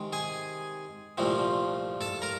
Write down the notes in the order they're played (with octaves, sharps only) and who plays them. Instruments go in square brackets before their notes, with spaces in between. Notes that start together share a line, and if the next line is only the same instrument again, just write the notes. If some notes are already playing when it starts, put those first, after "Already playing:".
Already playing: [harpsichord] C3 D#3 G#3 D#4
G#4 G#5
C2 A#2 F3 A3 C4
A4 A5
A#4 A#5